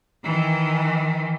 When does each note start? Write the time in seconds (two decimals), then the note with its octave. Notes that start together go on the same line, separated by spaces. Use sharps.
0.24 D#3 E3